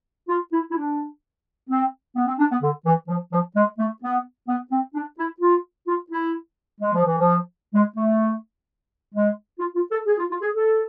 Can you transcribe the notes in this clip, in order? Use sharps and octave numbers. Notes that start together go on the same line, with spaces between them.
F4
E4
E4
D4
C4
B3
C4
D4
B3
D3
E3
F3
F3
G#3
A3
B3
B3
C4
D4
E4
F4
F4
E4
G#3
F3
E3
F3
G#3
A3
G#3
F4
F4
A4
G#4
F4
F4
G#4
A4